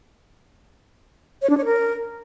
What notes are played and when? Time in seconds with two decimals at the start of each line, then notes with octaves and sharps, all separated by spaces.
1.42 C#5
1.50 D4
1.57 C#5
1.65 A#4